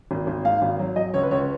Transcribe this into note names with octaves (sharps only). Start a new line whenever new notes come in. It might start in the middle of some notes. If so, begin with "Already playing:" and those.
G#1
G#1
G#2 F5
G#1
F#3
F#3 D#5
C#2 C#5
B4
C#2 C#5